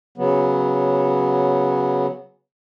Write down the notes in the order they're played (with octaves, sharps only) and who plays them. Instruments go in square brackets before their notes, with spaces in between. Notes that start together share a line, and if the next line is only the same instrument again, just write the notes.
[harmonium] C#3 F#3 B3